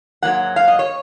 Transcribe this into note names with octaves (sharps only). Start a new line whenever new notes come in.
G#2 F#3 A#3 F#5
F5
D#5
C#5